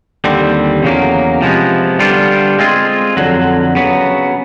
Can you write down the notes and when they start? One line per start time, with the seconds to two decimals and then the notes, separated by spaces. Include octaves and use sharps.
0.24 D#2 D3 G3 C4
0.83 E2 C#3 F#3 A#3
1.41 C3 F3 G#3 B3
1.99 D3 G3 B3 D4 F4
2.59 G#3 C4 F4 G#4
3.17 F2 D3 F#3
3.75 C#3 F#3 B3